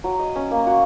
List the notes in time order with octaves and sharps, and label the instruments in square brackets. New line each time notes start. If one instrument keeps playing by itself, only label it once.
[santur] F#3
D#5
C#4
A#3
F#4